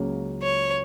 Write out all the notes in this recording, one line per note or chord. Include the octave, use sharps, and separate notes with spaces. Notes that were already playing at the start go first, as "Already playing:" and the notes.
Already playing: C#2 C#3 F#3 A#3 C#4
C#5